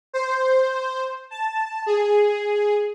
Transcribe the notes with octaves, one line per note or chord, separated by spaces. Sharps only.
C5
A5
G#4